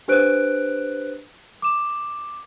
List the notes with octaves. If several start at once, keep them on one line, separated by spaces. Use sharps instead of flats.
D4 G4 B4 C5 F#6 D7
D6 E7